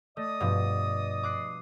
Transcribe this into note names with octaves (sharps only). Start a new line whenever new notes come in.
A3 D5 D#5 D#6
G2 B2 F3
D6 F#6 C7